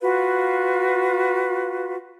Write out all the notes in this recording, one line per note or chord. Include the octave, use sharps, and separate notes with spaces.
F4 F#4 B4 F5